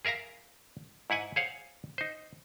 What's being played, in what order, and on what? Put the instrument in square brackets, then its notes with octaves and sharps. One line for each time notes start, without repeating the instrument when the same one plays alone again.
[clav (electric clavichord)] G#4 A#4 E5 F5 A#5
G#2 E4 F#5 G#5
G#4 C5 C#5 F5 F#5
D#4 C5